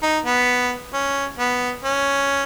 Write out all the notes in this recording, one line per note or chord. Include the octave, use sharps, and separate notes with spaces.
D#4
B3
C#4
B3
C#4